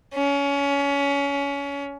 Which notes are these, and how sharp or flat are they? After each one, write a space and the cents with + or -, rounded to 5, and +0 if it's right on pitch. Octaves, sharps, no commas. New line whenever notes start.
C#4 +25